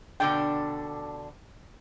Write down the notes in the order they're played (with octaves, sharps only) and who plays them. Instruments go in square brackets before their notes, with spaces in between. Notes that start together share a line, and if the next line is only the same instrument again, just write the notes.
[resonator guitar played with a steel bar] B2 D3 D4 [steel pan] G5